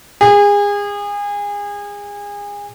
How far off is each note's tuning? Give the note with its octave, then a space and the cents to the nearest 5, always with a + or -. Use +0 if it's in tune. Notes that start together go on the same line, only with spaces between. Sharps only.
G#4 -30